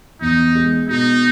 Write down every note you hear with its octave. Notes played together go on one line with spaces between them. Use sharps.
E2 D#4
G#3
B2 D#4